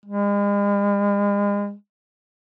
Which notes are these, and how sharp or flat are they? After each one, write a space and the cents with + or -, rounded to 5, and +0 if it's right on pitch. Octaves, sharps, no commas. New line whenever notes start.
G#3 -40